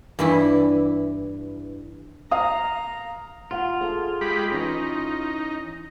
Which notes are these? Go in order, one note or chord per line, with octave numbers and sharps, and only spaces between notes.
G2 E3 E4
F5 A#5 D#6
F4 F5 F#5
G#4 A4 E5
G#3 G4 B5
E3 C#4 D#4